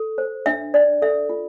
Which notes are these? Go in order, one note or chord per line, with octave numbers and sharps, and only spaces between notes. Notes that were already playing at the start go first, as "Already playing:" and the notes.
Already playing: A4
C5
D4 E5
D4 D5
A4 E5
F4